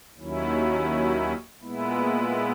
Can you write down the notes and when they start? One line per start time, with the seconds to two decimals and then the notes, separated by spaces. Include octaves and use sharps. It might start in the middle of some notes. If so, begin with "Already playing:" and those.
0.17 D#2 D#3 F#3 C#4 E4
1.62 A#2 G#3 B3 E4